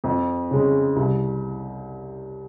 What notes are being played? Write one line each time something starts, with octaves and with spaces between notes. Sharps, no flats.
F2
C#3 G#3
C2